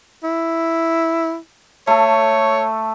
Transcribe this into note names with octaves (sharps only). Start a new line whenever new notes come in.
E4
A3 A4 C#5